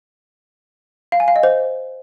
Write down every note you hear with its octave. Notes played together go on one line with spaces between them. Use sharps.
F5
G#5
F5
D#5
C5